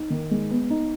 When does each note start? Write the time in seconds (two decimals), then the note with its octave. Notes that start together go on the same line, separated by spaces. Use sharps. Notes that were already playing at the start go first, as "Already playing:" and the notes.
Already playing: D#4
0.10 D#3
0.31 G#3
0.51 B3
0.70 D#4